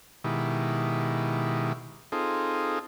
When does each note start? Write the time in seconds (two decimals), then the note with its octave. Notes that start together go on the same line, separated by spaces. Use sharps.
0.24 B2 D#3 G#3 E4 G4
2.12 C4 D#4 F4 G#4 A4